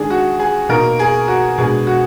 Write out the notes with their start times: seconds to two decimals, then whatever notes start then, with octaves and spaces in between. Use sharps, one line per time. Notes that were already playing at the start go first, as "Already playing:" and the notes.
Already playing: D#3 G#3 D4 G#4
0.10 F#4
0.39 G#4
0.69 B2 A#3 D#4 A#4
0.99 G#4
1.28 F#4
1.58 B2 G#3 D4 G#4
1.87 F#4